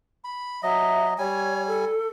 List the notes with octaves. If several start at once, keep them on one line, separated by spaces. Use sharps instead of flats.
B5
F#3 D#5 E5
G3 C#5 G#5
A4